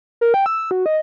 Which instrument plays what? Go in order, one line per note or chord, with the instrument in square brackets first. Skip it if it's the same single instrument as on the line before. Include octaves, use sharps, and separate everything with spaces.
[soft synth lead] A#4
G5
E6
F#4
D#5